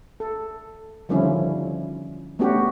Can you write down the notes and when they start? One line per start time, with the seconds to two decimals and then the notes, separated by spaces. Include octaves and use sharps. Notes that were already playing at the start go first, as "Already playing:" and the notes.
0.20 A4
1.09 D3 D#3 F3 G3 C#4 E4
2.39 A3 B3 C#4 D4 F#4 G4